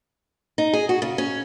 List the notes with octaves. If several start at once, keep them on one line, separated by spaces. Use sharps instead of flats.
D#4
G#4
F#4
C#3
C#4